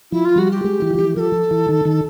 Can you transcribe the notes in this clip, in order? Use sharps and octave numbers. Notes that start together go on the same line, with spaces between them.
F3 E4
F4
G3 F#4
G4
G#3
E3
F3
E3
F3 A4 A#4
E3
D#3
D#3